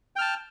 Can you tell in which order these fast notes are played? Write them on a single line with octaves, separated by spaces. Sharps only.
G5 F6 A5